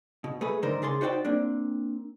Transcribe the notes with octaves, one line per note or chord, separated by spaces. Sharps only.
B2
A3 G#4 B4
G#2 D3 D#3 A#4 C5
C#3 G#4 D5 C6
D#4 F#4 C5 D5 G5
A#3 C4 D4